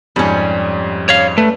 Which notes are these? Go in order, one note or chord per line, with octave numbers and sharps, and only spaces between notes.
F2 G#2 G3 C#4
C#5 F5
A3 B4